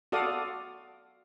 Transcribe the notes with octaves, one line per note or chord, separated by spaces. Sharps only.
F#4 A4 D5 F5 D#6